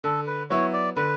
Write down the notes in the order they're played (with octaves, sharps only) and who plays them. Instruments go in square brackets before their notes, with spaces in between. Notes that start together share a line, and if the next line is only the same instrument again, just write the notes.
[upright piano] D3 [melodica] A4
[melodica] B4
[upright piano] F#3 B3 E4 [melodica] C#5
[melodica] D5
[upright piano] D3 [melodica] B4